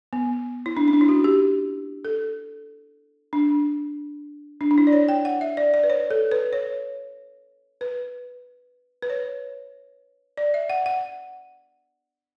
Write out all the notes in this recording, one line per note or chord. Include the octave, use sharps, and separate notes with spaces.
B3
E4
D4
C#4
D4
E4
F#4
G4
A4
D4
D4
D4
E4
D5
C#5
G5
F#5
E5
D5
D5
B4
C#5
A4
B4
C#5
B4
B4
C#5
D5
E5
F#5
F#5